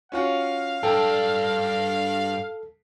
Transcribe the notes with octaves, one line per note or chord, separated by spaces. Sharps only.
C#4 F4 F#4 F5
G2 D4 A4 G5 A5